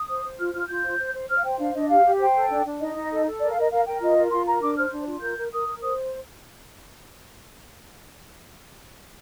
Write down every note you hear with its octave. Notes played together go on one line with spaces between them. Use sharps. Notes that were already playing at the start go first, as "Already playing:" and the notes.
Already playing: D#6
C5
C5
F4 F6
F4 F6
F4 G6
C5
C5
C5
C5 F6
F5
C5 G5
D4 F5
D4 D#5
G4 F5
G4
C5 G5
A4
D4
D4
D#4 D#5
D#4
A4
A4
A#4 D5
F5
A#4
D#5
A#4 F5
A#4 G5
F4 D#5
A#4
F4 C6
A#4 A#5
D4 D6
C5 F6
D4
F4
A#4 G6
A#4
A#4 D#6
A#4
C5 D#6